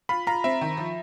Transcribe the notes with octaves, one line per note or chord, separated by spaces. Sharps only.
F4 B5
F4 A#5
C4 E5
D#3
F3